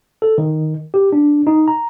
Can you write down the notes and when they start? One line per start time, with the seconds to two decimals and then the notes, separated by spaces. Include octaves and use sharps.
0.22 A4
0.38 D#3
0.94 G4
1.13 D4
1.47 D#4
1.68 A#5